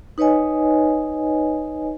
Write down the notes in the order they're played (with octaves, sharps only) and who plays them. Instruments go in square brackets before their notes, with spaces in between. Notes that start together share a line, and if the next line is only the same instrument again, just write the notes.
[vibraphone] D#4 B4 C#5 D#5 G#5